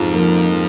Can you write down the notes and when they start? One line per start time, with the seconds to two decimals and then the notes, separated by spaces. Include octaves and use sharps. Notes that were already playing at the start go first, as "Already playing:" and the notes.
Already playing: F2 G#2 F3
0.13 A#3